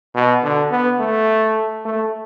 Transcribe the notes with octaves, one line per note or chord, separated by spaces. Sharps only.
B2
D3
B3
A3
A3